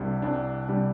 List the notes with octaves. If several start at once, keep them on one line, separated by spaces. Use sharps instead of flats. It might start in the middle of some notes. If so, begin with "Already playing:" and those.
Already playing: C2 C3 G3 D4
C2 C3 G3 D4
C3 G3 D4